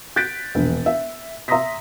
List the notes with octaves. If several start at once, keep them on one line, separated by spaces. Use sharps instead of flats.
F#6 G6 A6 B6 D7
E1 A#1
E5
E5 A#5 C6 D#6 A#6 B6